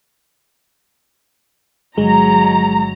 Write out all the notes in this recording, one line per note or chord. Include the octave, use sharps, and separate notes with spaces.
G1 F#3 G#3 A#5